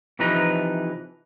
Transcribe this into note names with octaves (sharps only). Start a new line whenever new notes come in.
C3 E3 F3 D#4 B4 A#5